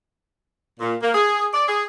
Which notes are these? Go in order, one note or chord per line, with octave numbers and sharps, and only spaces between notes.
A#2
A#3
G#4
D5
G#4